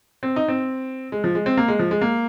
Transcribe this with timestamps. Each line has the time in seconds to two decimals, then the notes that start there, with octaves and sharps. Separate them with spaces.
0.23 C4
0.36 D#4
0.48 C4
1.12 G#3
1.24 F3
1.35 G#3
1.46 C4
1.57 A#3
1.68 G#3
1.79 F3
1.91 G#3
2.01 A#3